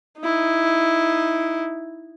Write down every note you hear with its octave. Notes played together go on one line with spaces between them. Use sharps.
D#4 E4